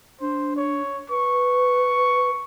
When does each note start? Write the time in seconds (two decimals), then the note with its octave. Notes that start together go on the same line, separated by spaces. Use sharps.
0.21 D4 C5
0.56 C#5
1.10 B4 C#6